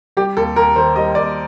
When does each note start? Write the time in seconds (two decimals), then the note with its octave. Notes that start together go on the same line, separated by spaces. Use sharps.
0.17 G3 G4
0.37 D#2 A4
0.56 D#2 A#4
0.76 D#3 C5
0.96 G3 D#5
1.15 D#2 D5